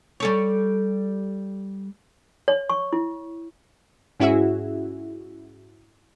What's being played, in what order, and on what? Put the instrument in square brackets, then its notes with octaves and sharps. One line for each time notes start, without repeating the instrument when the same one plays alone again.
[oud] G3 A4 C#5
[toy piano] C#5
C#6
E4
[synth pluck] G#2 C#4 E4 F#4 G#4 E5